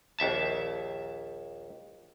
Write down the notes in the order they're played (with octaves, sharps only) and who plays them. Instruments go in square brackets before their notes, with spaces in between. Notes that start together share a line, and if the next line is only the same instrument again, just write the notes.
[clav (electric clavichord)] A#1 D#2 E5 A5